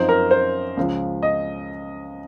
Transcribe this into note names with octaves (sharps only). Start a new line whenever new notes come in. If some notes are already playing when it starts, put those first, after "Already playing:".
Already playing: F#2 F3 C4 D#4 C5
A#4
C5
C#2 C#3 F3
D#5